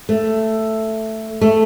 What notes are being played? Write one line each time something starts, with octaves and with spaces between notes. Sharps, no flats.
A3
A3